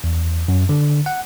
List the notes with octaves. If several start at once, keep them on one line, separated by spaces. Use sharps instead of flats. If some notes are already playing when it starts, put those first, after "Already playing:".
E2
F#2
D3
F#5